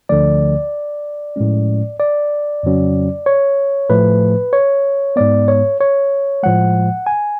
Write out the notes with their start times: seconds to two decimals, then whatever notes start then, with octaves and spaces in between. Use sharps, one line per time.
0.09 D2 D3 F3 A3 D5
1.36 A2 F3 G#3 C#4
1.99 D5
2.63 F2 C#3 F#3 C#4
3.26 C#5
3.90 A2 F3 A3 B4
4.53 C#5
5.16 G#2 G#3 B3 D5
5.48 C#5
5.80 C#5
6.43 A2 F3 G#3 F#5
7.06 G#5